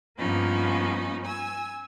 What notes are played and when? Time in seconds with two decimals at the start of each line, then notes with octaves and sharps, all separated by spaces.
0.18 G2 F3 A#3 B3 C#4 D#4
1.25 G#5 E6